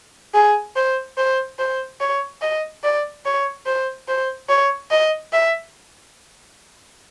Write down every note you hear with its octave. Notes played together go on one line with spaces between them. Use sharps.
G#4
C5
C5
C5
C#5
D#5
D5
C#5
C5
C5
C#5
D#5
E5